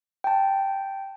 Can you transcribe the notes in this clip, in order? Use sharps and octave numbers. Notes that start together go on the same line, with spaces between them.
G5 A5